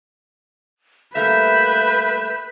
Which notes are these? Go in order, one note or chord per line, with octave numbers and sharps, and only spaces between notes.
G3 A3 A#3 B4 E5 G6